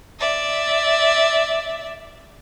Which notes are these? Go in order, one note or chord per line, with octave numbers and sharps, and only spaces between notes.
D5 E5